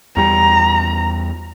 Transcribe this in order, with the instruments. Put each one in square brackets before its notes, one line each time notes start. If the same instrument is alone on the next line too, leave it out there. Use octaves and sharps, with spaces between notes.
[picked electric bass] E2 G3 [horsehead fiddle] A#5